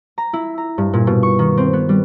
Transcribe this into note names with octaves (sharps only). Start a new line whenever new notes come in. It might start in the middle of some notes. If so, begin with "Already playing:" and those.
A#5
E4
A#5
G2
A#2
B2
C#6
D#3
C4
B3
G3